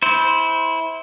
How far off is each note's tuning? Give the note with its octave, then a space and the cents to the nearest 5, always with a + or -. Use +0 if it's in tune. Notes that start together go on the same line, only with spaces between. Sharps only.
E4 -20 C5 +0